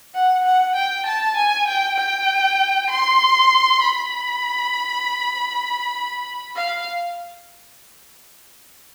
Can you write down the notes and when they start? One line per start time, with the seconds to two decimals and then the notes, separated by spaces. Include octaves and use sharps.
0.14 F#5
0.44 F#5
0.75 G5
1.06 A5
1.36 G#5
1.67 G5
1.98 G5
2.90 C6
3.81 B5
6.56 F5